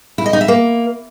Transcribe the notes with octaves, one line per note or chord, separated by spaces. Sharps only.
E4
D#5
D#4
E5
A#3